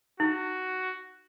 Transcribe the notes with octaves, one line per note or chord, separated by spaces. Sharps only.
D#4 F#4